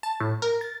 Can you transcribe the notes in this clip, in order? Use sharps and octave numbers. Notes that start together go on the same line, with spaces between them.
A5
A2
A#4
A6